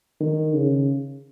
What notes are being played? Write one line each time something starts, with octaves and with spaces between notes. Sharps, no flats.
D#3
C#3